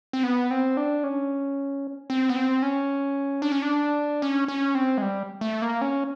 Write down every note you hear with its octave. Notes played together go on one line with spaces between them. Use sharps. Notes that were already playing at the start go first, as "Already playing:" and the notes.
C4
B3
C4
D4
C#4
C4
B3
C4
C#4
D4
C#4
D4
C#4
C#4
C4
G#3
G3
A3
A#3
C#4